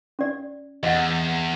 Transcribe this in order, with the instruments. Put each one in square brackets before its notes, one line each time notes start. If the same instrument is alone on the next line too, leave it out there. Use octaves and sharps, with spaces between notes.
[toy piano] C#4 D5
[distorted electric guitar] E2 [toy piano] D#5 F#5